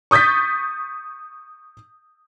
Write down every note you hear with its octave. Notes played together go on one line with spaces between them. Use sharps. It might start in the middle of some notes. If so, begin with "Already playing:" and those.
C#6 D#6 G6 A6 B6